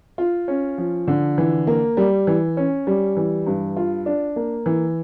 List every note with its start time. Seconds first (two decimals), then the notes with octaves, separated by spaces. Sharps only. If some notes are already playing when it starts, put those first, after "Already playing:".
0.18 F4
0.48 C#4
0.78 F3
1.08 D3
1.38 E3
1.67 A#3
1.97 G3
2.27 E3
2.57 C#4
2.87 G3
3.17 E3
3.46 G2
3.77 F4
4.06 D4
4.36 A#3
4.66 E3